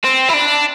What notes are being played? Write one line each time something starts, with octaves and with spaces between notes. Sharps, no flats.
C4
E4
D4